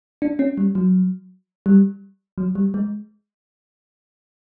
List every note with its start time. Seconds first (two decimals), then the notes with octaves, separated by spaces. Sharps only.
0.22 D4
0.39 C#4
0.58 G3
0.75 F#3
1.66 G3
2.38 F#3
2.55 G3
2.74 G#3